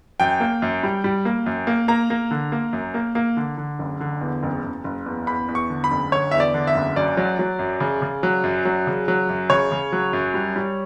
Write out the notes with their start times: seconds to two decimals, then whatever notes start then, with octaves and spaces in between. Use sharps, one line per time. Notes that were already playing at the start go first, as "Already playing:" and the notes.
0.20 F#2 G5
0.40 A#3
0.62 F#2
0.83 G3
1.04 G3
1.25 A#3
1.46 F#2
1.67 A#3
1.88 A#3 A#5
2.10 A#3
2.31 D3
2.52 A#3
2.73 F#2
2.94 A#3
3.15 A#3
3.37 D3
3.57 D3
3.79 F#1
4.00 D3
4.21 E2
4.43 F#1
4.64 F#1
4.84 F#1
5.06 E2
5.27 E2 B5
5.48 E2
5.55 C#6
5.70 D3
5.84 B5
5.91 F#1
6.12 D3 C#5
6.31 E2 E5
6.40 D5
6.54 D3
6.67 E5
6.75 F#1
6.96 F#2 D5
7.17 F#3
7.39 F#3
7.59 F#2
7.80 C#3
8.02 C#3
8.23 F#3
8.44 F#2
8.65 F#3
8.87 C#3
9.08 F#3
9.29 F#2
9.50 C#3 C#5
9.72 C#3
9.92 F#3
10.13 F#2
10.34 G3
10.56 G3